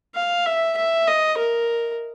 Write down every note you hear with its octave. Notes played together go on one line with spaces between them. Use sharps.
F5
E5
E5
D#5
A#4